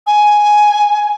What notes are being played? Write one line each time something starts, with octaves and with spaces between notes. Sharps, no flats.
G#5